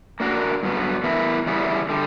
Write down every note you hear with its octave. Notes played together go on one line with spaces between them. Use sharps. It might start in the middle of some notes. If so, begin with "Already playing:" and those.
A#3 D4 F#4 A#4
G2 F#3 B3
E3 B3 E4 A#4 E5
E2 C#3 G3 B3 E4
D3 G3